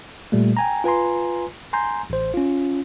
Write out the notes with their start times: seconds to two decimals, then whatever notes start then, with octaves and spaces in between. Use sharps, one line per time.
0.32 A#2 G3 A3
0.57 G5 G#5 A#5
0.84 F4 B4 G#5 A#5 C6
1.73 G#5 A#5 C6 G6
2.10 A1 C5
2.34 C#4 F4